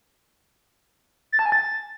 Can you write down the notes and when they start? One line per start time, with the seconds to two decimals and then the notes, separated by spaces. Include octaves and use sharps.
1.32 A6
1.39 A5
1.46 G#5
1.52 A6